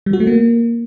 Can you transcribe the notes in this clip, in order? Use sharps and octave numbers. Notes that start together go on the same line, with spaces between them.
G3
F#4
A3
A#3